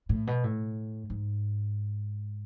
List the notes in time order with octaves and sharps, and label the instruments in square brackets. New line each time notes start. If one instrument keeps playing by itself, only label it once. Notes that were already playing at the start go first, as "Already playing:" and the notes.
[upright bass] A2
B2
A2
G#2